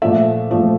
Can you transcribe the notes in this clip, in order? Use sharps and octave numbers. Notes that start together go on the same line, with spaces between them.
A#2 F3 A3 E5
A#2 F3 A3